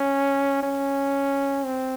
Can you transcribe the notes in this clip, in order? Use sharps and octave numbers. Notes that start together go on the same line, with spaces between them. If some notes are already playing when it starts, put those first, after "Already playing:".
Already playing: C#4
C#4
C4